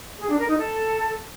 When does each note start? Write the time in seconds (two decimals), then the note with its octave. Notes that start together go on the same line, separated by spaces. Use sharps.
0.19 G#4
0.29 D4
0.38 A#4
0.47 D#4
0.57 A4